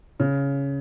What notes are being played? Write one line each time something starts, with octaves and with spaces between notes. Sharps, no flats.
C#3